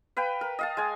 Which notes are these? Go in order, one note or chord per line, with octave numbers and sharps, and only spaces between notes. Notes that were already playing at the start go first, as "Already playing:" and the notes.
B4 F5 G5
A#4
D#5 F5 A5
G#3 G#5